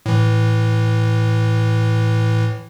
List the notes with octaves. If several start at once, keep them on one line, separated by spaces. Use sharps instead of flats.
A2 E3